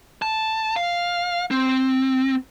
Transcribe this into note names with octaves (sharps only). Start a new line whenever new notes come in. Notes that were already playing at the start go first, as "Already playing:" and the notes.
A5
F5
C4